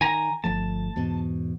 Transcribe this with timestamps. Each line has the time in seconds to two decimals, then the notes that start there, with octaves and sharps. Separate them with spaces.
0.01 D#3 G#5 A#5
0.44 G1 F3 A3 A5
0.96 E2 G#2 B2